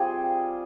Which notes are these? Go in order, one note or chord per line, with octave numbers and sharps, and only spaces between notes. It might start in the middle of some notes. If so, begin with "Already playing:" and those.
Already playing: G3 C4 F4 G#4